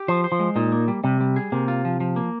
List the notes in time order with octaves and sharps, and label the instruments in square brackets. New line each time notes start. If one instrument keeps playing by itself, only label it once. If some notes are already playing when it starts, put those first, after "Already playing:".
Already playing: [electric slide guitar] G4
[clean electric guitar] F3 [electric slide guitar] C5
[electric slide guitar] C5
[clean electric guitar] F3
[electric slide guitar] G#3
[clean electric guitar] A#2 [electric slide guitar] D#4
[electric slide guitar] A#3
G3
[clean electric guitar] C3 [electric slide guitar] G3
[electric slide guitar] G3
G#4
[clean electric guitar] C3 [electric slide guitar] A#3
[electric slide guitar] F4
F3
F3
A#3